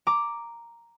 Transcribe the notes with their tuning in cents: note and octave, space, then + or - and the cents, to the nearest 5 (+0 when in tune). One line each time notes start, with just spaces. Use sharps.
A#5 +0 D6 +0